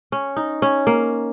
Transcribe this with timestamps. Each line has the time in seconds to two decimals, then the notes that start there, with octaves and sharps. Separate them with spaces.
0.12 C#4
0.36 D#4
0.62 C#4
0.87 A#3